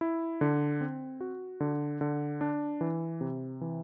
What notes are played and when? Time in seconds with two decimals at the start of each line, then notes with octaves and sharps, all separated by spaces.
0.01 E4
0.41 D3
0.81 C4
1.21 F#4
1.60 D3
2.01 D3
2.41 D4
2.81 E3
3.21 C3
3.61 E3